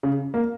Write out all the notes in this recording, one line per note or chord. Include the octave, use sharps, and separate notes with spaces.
C#3
A#3